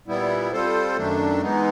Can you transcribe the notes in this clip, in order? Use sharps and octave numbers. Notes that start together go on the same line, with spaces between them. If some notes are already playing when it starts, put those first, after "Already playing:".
A#2 G3 B3 E4
G3 C4 F4 A4 C5
F#2 D#3 F#3 A3 D4
E3 G#3 B3 D#4